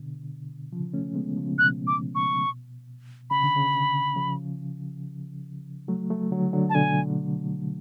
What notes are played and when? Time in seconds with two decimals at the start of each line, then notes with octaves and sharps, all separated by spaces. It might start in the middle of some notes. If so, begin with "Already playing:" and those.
Already playing: B2 D3
0.72 C#3 F3
0.94 A3 C#4
1.15 G#3 B3
1.37 C#3 F3
1.58 B2 F#6
1.87 D6
2.15 C#6
3.30 C#3 B5
3.43 D3
3.56 C#3
4.16 C#3 F3
5.88 F#3 A3
6.10 F#3 A3
6.31 D3 F#3
6.53 D3 F#3
6.70 A5
6.75 B2 D3 G#5